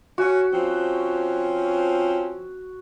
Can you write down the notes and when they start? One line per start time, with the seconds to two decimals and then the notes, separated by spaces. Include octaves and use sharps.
0.18 C#4 F#4
0.52 F3 C4 C#4